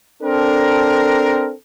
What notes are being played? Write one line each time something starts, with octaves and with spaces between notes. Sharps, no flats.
C4 D4 A4 A#4